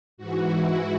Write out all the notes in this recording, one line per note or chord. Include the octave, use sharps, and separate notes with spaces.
G#2 E3 F#4
E4